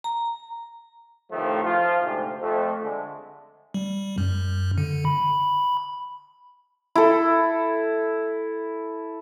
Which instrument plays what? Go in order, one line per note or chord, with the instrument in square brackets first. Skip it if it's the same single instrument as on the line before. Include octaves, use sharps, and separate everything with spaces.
[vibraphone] A#5
[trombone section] A2 C3 D#3 F3 A3
F3 F4
D2 G#2 C3
F2 A3
D3 G#3
[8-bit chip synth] G3
F#2
D3
B5
[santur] E4 A4